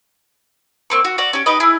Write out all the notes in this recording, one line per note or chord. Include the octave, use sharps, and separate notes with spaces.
A#3 C4 C#6
F#4
F#4 D5
C#4 G4
D#4 G4 B4 D#5
E4 G#4